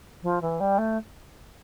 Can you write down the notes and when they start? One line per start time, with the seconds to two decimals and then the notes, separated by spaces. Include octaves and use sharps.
0.23 F3
0.41 E3
0.60 G3
0.78 A3